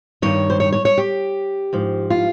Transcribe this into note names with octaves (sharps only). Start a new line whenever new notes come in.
G2 D#3 C#5
C5
C#5
C#5
C#5
G4
G#2 F3
F4